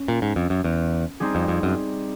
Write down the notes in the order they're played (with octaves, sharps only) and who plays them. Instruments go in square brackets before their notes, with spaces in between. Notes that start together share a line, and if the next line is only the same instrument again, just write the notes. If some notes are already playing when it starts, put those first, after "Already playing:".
Already playing: [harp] C#4
[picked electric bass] A#2
G#2
F2
F#2
E2
[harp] G3 C4 D#4 G#4
[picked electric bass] F2
F2
F#2